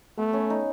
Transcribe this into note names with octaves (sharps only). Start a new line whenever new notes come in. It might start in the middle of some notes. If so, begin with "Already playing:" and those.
A3 B3
C#4
D#4